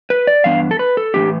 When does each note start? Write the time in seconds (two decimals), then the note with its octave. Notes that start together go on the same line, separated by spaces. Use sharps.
0.10 B4
0.27 D5
0.44 G2 E3 B3 D4 F5
0.71 A4
0.79 B4
0.97 A4
1.14 A2 E3 B3 D4 G4